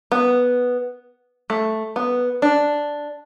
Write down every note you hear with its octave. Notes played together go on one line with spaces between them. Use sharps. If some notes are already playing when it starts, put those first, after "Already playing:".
B3
A3
B3
D4